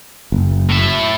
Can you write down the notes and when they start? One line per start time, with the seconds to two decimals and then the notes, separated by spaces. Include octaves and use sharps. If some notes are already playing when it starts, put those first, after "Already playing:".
0.32 F#1
0.69 A2 E5